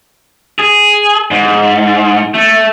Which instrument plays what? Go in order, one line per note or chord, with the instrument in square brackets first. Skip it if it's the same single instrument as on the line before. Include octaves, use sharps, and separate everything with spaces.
[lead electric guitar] G#4
G#2
A3